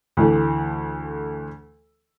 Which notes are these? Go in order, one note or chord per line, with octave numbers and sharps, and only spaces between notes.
D2 E3 A3